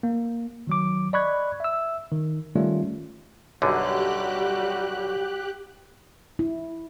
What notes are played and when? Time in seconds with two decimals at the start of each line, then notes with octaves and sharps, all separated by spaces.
0.03 A#3
0.67 D#3 F#3 D6
1.13 D5 D#5 B5 C#6 F#6 G#6
1.60 E5 E6
2.11 D#3
2.55 D#3 G3 A3 C#4 F4
3.62 B1 F#2 D3 G3 F#4 G4 F#6
6.39 E4